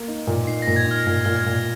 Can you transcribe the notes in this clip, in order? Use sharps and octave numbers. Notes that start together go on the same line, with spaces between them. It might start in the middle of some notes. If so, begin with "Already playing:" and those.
Already playing: A#3
D#4
A#2
D#4 C7
A#6
A#2
G#6
D#4 F6 G#6
A#2 A#6
A#2 F6
G#6
A#2